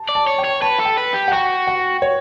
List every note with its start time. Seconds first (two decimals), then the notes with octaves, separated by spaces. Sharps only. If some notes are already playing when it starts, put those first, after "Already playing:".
Already playing: A5
0.09 D5
0.15 A5
0.27 C#5
0.38 G5
0.44 C#5
0.62 B4 A5
0.79 A4
0.85 G5
0.97 B4
1.14 G4
1.28 F#5
1.32 F#4 G5
1.67 F#5
2.02 C#5